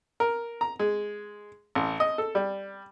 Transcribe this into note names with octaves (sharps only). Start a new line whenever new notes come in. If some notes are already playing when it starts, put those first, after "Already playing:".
A#4
A#5
G#3
A1
D#5
A4
G3